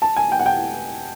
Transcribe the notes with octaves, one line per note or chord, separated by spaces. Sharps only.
A5
G#5
G5
F#5
G5